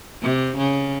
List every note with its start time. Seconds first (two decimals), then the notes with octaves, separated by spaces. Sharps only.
0.23 C3
0.57 C#3